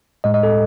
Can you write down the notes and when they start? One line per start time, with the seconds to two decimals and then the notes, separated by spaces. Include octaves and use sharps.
0.24 A2 G#3 D#5
0.34 D#5
0.43 A4